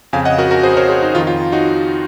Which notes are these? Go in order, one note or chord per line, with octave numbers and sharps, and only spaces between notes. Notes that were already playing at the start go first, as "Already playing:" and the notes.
F2 C#3 F5 G#5
D#5 F#5
F#4 A#4
F#4 A#4
G#4 C5
A#4 C#5
G#4 C5
D#4
F2 D#3 F4
F4
D#4 F#4